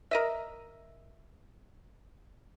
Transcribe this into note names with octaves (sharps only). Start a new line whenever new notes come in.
A#4 D#5 E5